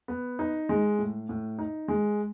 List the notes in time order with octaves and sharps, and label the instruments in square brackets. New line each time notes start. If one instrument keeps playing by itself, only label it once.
[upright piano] B3
D#4
G#3
A2
A2
D#4
G#3